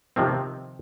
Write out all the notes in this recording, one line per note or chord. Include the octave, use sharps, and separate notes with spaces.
C3 D#3 F3 C4